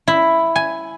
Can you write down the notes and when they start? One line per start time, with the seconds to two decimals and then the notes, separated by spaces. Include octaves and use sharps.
0.07 E4
0.56 G#5